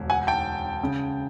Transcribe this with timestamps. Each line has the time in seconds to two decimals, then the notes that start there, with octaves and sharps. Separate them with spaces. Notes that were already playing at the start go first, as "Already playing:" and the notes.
Already playing: E1 D2
0.10 F#5 G#5
0.27 G5 A5
0.83 C#3